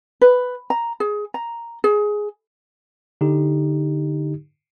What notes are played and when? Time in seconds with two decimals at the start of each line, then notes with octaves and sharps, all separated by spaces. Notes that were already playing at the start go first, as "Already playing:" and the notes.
0.21 B4
0.70 A#5
1.00 G#4
1.34 A#5
1.84 G#4
3.21 D3 D#4 G4